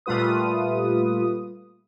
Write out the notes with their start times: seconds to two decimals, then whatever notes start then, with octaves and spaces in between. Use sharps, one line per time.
0.06 A#2 G3 A3 F4 B4 D#6